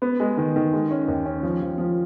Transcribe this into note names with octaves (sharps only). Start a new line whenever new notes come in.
B3
G#3
D#3
D#3
G#3
C#4
D#2
C#4
F3
F3
F3